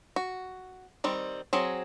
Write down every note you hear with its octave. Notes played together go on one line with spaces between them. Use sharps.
F#4
D#3 G3 C4
F#3 C4 G#4